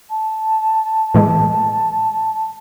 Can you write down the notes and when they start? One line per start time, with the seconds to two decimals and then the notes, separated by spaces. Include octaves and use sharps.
0.10 A5
1.14 A2 E3 G#3